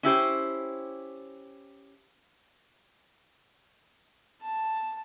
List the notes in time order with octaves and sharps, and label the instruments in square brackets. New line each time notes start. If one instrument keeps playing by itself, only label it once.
[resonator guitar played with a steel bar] C#4 E4 G4 C5
[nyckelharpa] A5